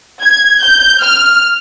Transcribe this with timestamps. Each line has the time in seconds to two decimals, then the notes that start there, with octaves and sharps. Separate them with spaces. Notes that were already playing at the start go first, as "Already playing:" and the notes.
0.21 G#6
0.61 G6
1.02 F6